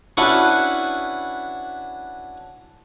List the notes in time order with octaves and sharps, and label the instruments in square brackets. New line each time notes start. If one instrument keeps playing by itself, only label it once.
[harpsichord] C#4 D4 E4 F#4 B4 F#5